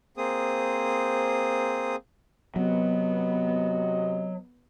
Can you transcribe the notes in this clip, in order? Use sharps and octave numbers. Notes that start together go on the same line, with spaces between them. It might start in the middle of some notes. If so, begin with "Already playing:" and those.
A#3 C4 G#4 C5 D#6
C3 F#3 B3 F#4 D#5